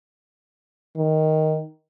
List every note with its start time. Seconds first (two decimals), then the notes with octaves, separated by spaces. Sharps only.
0.97 D#3